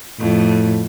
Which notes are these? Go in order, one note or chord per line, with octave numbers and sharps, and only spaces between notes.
F2 A2 A3